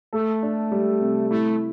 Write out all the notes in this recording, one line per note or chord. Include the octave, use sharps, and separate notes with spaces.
A3 A4
D4
G3
C3
A3 E4